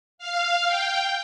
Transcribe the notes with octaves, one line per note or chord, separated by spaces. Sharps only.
F5
G5